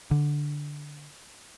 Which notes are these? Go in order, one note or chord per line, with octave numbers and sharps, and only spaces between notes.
D3